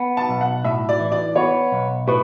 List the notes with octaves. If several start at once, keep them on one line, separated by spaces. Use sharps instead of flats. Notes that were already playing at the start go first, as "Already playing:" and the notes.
Already playing: B3
A5
B1
F#5
A2 E5
D5
E3
D5
B3 C#5
B1
A2 B4